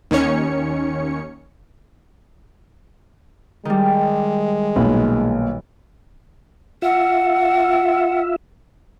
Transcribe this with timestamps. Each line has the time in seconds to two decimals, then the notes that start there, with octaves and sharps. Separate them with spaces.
0.11 D#2 D#3 C#4 C#5 C#7
3.65 D#3 G3 G#3
4.76 B1 A#2 B4
6.82 F4 E5 F#5